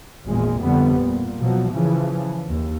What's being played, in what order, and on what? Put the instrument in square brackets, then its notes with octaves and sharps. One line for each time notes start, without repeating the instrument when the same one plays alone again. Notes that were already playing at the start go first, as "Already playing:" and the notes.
[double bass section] G#1 E2 A#2 G#3
G1 F2 D3 G3 B3
A#2
B2 F3 F#3
C#3 E3 F3
D#2